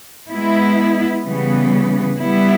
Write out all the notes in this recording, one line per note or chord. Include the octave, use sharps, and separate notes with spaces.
G#3 B3 E4
C#3 E3 G3 B3
G3 B3 E4